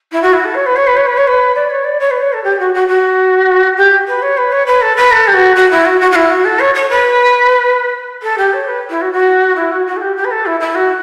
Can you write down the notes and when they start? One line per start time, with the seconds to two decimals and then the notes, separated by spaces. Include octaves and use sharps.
0.12 E4
0.22 F#4
0.33 E4
0.45 A4
0.55 C#5
0.66 B4
0.76 C#5
0.87 B4
0.97 C#5
1.07 B4
1.17 C#5
1.27 B4
1.55 D5
1.70 C#5
1.84 D5
2.00 C#5
2.11 B4
2.21 C#5
2.33 A4
2.44 G4
2.59 F#4
2.74 F#4
2.88 F#4
3.77 G4
4.08 B4
4.22 C#5
4.37 B4
4.52 C#5
4.67 B4
4.82 A4
4.97 B4
5.12 A4
5.27 G4
5.34 F#4
5.56 F#4
5.71 E4
5.86 F#4
6.01 F#4
6.11 F#4
6.16 E4
6.30 F#4
6.45 A4
6.60 C#5
6.75 C#5
6.90 B4
8.23 A4
8.38 G4
8.53 C#5
8.68 B4
8.90 E4
9.01 F#4
9.13 F#4
9.56 E4
9.71 F#4
9.87 F#4
9.97 A4
10.01 G4
10.17 G4
10.25 B4
10.31 A4
10.46 E4
10.60 E4
10.75 F#4